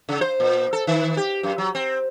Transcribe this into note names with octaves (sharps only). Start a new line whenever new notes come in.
C#3
C5
A#2
A4
D#3
G4
F#2
F#3
C4